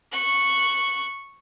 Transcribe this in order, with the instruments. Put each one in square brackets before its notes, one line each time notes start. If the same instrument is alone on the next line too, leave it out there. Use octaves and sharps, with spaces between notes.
[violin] C#6 F#6